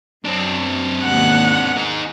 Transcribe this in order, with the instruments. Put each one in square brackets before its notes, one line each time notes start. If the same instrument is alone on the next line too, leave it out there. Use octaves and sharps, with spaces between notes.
[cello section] F#2 [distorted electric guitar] C4 D4
[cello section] D#2 G#2 B2 [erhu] F#5
[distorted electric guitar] D#4 G#4